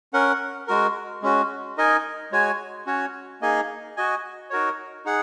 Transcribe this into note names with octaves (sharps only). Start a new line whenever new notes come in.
C#4 A#4 F#5
G#3 F#4 A#4
G#3 C#4 F#4
D#4 A#4 D#5 G#5
G#3 F#4 C#5 G#5
C#4 F#4 C#5
A#3 D#4 G#4 D#5 G#5
F#4 D#5 G#5
D#4 F#4 A#4 C#5
D#4 G#4 F#5